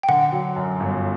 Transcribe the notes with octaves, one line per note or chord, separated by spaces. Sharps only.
G5
D3 F#5
F#3
F#2
G1